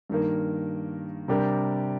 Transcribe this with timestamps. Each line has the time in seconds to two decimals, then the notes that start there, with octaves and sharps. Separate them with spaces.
0.10 G2 D#3 A#3
1.28 C3 G3 D4 G4 A#4